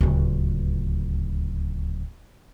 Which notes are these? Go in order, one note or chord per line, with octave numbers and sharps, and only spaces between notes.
D1 C#2